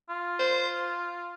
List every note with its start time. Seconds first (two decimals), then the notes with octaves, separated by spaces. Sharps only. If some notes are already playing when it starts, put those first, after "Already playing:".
0.09 F4
0.39 C5